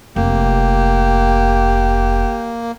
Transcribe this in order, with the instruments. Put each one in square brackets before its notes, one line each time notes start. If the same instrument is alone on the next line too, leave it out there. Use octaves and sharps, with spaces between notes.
[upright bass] F1 [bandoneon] A#3 [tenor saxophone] G4